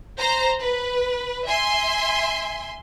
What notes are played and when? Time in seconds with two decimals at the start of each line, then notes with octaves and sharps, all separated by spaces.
0.18 C5 A#5
0.60 B4
1.46 E5 G#5 C6